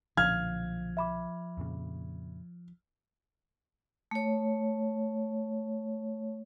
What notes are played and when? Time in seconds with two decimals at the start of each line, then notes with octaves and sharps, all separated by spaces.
0.17 B1 A#2 D3 F3 F5 F6 G#6
0.97 E5 B5 D6
1.57 F2 A#2 C#3
4.11 A3 C#5